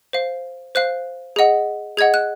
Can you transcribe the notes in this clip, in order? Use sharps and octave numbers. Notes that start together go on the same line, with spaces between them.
C5 F5
C5 F5 F#6
G#4 D#5 F#5
G#4 D#5 F#5 G#6
F#6